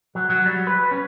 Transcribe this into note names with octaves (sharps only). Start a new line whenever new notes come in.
F#3
F#3
G3
B4
C#4